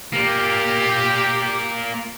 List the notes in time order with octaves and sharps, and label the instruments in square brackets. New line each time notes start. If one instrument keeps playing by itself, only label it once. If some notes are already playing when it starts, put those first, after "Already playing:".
[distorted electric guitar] A#3 F4 [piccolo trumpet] G4